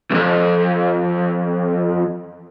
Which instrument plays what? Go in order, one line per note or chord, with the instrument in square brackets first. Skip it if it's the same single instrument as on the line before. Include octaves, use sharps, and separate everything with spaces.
[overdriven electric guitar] B1 F2